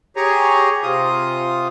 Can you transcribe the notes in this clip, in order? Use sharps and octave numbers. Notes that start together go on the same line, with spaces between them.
G4 G#4 C#5 G#5 A#5
C3 F4 D#6